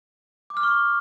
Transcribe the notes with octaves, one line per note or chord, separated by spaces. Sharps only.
D6
F6
C#6